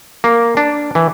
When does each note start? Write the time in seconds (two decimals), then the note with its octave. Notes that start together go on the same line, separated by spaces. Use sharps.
0.24 A#3
0.57 D4
0.95 E3